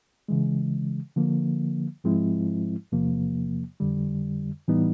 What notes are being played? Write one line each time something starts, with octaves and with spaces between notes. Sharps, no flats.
C#3 E3 G#3
D3 F3 A#3
G#2 F3 G#3 C4 E4
E2 C3 F3 A#3
F2 D3 G3
A2 E3 G3 B3 D#4